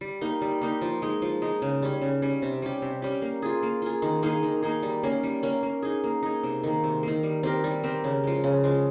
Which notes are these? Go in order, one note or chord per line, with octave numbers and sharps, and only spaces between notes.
G3
A#3 D#4 G4
G3
A#3 D#4 G4
F3
G#3 D#4
F3
G#3 D#4
C#3
G3 C#4
C#3
G3 C#4
C3
G3 C#4 G4
C3
G3 C#4 G4
A#3
F4 G#4
A#3
F4 G#4
D#3
A#3 D#4 G#4
D#3
A#3 D#4 G#4
G3
A#3 C#4
G3
A#3 C#4
A#3
D#4 G#4
A#3
D#4 G#4
C3
D#3 A#3
C3
D#3 A#3
G3
C4 G4 A#4
G3
C4 G4 A#4
C#3
F3 G#3
C#3
F3 G#3